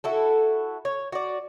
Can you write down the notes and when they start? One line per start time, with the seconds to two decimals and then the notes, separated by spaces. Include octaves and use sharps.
0.04 E4 F#4 A4
0.85 C#5
1.12 F#4 D5